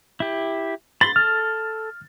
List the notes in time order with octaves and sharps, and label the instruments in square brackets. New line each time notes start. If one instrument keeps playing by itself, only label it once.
[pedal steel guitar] E4 G4
[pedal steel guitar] B5 C6 [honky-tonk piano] A6
[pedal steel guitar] A4 [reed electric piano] F6